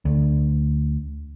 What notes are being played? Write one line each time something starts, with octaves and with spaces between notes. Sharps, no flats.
D2